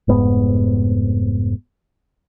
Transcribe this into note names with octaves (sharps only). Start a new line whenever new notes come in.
F1 G#2 B3